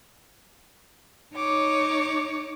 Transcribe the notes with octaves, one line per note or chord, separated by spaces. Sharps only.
D#4 C#5 D6